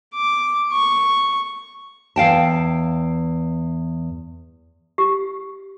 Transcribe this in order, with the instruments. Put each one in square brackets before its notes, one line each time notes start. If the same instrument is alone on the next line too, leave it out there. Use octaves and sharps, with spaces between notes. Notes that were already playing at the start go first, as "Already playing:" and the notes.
[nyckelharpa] D6
C#6
[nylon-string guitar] E2 F5 G5 A5
[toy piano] G4